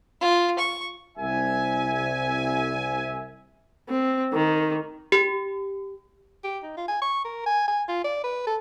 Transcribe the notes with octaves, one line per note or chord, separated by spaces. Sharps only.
F4
C#6
C2 E5 G#5
C4
D#3
G4
G4
D#4
F4
G#5
C#6
A#4
G#5
G#5
F4
D5
B4
A4